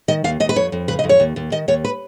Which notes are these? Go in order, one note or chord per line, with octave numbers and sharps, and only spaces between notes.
D#3 D#5
D#2 F5
D#2 D#5
B4
F2 C#5
F2
C#3 B4
D#5
F2
C#5
D#2
D#2
D#3 D#5
D#2 C#5
B4